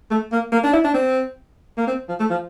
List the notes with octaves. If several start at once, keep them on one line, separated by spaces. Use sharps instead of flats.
A3
A#3
A#3
D4
E4
D4
C4
A#3
C4
F3
A3
F3